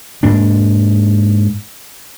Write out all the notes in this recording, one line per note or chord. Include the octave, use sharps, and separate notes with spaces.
G#2 A#3 D4